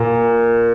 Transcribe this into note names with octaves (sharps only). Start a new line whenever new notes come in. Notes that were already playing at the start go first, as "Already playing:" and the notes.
Already playing: A#2